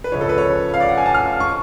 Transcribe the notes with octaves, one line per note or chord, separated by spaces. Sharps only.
B4
C#2 C#3 F3 C#5
A4
B4
C#5
F5
D5
F#5
G#5
A5
F6
C#6